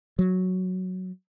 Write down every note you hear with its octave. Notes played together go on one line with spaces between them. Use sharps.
F#3